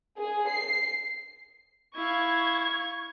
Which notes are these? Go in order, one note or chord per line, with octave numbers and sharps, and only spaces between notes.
G#4
C7
E4 F5 C#6 G#6